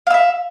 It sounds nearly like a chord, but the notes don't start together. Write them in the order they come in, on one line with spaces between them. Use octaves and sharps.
F5 E6 E5